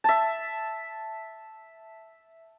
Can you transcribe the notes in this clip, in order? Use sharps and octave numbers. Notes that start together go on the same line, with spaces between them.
E5 A5